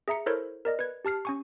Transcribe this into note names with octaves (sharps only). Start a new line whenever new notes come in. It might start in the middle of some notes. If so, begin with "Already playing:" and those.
G#4 E5 A#5 C#7
E4 A4 A#4 C5 C#5
A#4 D5 D#5
B4 G#6
G4 A5 F6 C7
C#4 G#5 C#6